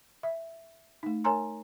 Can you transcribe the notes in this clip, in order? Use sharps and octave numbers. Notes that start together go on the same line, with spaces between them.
E5
A3 D#4
A#4 C#5 G#5 A#5 C6